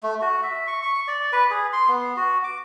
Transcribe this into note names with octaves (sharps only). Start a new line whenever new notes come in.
A3
F#4
E5
C#6
C#6
D5
B4
G#4
C6
B3
F#4
D6